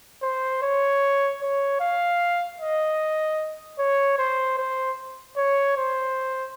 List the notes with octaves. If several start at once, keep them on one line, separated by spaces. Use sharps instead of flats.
C5
C#5
C#5
F5
D#5
C#5
C5
C5
C#5
C5